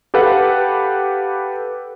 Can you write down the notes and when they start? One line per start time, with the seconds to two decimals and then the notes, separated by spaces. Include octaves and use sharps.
0.14 G4 A4 B4 F5 F#5